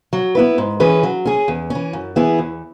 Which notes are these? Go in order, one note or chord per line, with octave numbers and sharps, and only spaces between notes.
F#3
B3 E4 B4
G#2
E3 C#4 G#4 B4
F#3
C#4 G#4
E2
E3 C#4
F#2
E3 B3 E4 G#4
E2